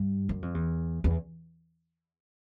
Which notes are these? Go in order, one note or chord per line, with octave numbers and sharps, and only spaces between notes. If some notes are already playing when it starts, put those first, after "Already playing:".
Already playing: G2
F#2
F2
E2
E2